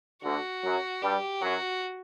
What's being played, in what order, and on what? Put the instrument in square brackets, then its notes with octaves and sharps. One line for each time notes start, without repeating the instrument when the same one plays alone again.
[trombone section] D2 D3 [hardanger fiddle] F#4
[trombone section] F#2 F#3
[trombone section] G2 G3 [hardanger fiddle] G4
[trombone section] F#2 F#3 [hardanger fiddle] F#4